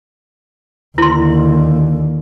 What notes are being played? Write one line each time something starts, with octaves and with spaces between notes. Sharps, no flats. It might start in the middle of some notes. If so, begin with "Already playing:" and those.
D#2 D3 E4 C6